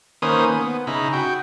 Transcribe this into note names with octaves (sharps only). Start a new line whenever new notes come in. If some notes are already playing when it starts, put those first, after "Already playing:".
D#3 A#3 C#4 B4 C5 D#6
B3
C#3 D#4 E4 B5
F#4 G5